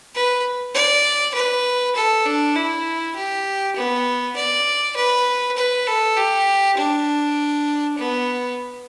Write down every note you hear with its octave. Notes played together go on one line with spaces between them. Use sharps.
B4
D5
B4
A4
D4
E4
G4
B3
D5
B4
B4
A4
G4
D4
B3